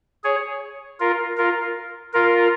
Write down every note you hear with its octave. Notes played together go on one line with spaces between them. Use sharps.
G#4 C#5
F4 A#4
F4 A#4
F4 A#4